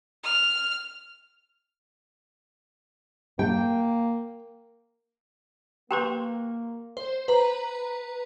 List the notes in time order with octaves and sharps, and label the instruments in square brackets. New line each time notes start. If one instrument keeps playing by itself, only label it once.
[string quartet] F6
[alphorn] A#3 [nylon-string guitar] G5
[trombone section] A#3 [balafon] G4 A#4 B4 [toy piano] G5 C6 C#6
[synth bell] C5
B4 A#5